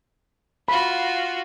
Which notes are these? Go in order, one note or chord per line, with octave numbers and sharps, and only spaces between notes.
F4 F#4 B5